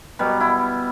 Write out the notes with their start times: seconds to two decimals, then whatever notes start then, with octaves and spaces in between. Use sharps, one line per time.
0.19 B2 F#3 G3
0.40 E4